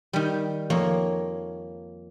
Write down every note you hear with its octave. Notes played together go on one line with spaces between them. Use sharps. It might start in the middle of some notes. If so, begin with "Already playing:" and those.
D#3 G3
F2 A#3 C#5